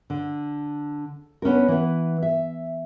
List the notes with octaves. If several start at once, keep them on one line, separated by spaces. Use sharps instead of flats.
D3
B3 C#4 D4 A#4
E3 B3
E5